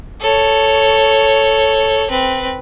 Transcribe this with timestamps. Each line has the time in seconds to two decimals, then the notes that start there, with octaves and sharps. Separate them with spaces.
0.21 A4 C#5
2.10 C4 B4